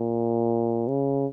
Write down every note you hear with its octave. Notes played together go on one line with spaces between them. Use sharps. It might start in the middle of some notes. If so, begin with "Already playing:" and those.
Already playing: A#2
C#3